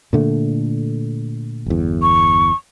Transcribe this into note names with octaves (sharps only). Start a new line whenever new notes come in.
A#2 D3 A3
G1 E2
C#6